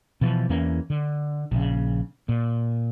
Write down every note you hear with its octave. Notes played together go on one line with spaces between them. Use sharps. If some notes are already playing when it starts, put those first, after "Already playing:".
B2 E3 F3
E2 E3 A#3 C#4
D3
A#1 C#3
A#2